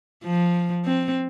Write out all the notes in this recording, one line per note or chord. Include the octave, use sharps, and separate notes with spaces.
F3
C4